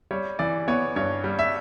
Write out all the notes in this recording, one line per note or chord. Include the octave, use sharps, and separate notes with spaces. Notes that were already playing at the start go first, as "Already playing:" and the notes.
G3 C#5
E3 D5
B3 C#5
G2 C#5
G3
E5